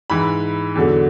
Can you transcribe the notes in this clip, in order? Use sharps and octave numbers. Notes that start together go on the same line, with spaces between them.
G#2 E3 B5
E2 D3 F#3